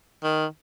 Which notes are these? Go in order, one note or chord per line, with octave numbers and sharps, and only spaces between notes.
D#3